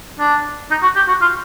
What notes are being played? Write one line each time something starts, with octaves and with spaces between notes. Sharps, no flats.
D4
D#4
F#4
G4
F#4
F4